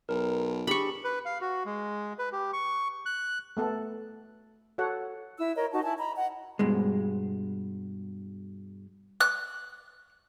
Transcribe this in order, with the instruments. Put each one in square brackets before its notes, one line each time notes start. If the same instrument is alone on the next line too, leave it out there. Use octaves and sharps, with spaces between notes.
[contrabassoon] B1 [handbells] A#4
[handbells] D4 G4 G#4 [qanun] B5 C#6
[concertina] B4
F5
F#4
G#3
B4
G4
C#6
F#6
[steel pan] A3 B3 A4
F#4 A4 C#5 F#5
[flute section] E4 E6
A#4 C#5 D#5
D#4 F#4 A5
E4 G#5 A5
D#5 A#5 B5
D#5 F#5
[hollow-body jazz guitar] G2 B2 G#3
[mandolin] F#6